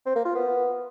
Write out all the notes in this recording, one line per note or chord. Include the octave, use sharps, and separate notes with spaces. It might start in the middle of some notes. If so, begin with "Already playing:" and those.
C4
A#3
F4
B3